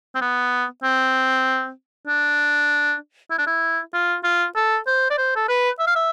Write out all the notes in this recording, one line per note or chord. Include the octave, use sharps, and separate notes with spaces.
C4
B3
C4
D4
E4
D4
E4
F4
F4
A4
C5
D5
C5
A4
B4
E5
F5
E5